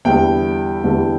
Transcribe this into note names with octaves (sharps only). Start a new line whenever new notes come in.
E2 D3 G3 E4 G5
E2 D3 G3 E4